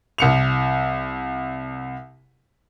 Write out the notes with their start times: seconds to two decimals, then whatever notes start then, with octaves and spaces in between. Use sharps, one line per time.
0.18 C2 C#7 F7